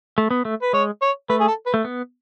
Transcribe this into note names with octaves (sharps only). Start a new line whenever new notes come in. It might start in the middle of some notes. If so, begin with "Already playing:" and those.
A3
B3
A3
B4
G#3 C#5
C#5
A3 B4
G#4
A4
B4
A3
B3